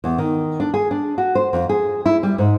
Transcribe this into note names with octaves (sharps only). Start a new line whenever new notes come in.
E2
D#3
D4
G#4
D4
F#4
C5
F2
G#4
E4
G3
G#2